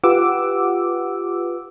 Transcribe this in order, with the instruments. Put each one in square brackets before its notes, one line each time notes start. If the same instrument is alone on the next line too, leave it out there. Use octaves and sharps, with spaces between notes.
[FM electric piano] F4 G4 B4 F#5 D6 E6